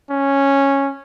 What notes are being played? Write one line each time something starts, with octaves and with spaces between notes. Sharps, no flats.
C#4